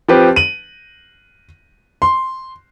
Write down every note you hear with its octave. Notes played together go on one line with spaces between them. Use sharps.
F3 C4 G4 B4
D#7 F#7
C6